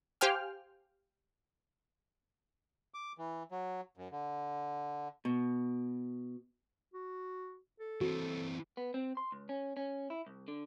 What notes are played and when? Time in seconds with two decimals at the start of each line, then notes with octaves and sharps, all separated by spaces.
0.21 G4 C5 F5 G5 G#5 F6
2.94 D6
3.18 E3
3.51 F#3
3.97 F#2
4.12 D3
5.25 B2
6.94 F#4
7.80 A4
8.01 E3 C4 F#4
8.77 B3
8.94 C4
9.17 C6
9.32 C#2
9.49 C#4
9.77 C#4
10.10 E4
10.27 C2
10.48 D3